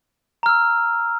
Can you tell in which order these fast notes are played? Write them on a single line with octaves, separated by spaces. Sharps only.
A#5 F6 E6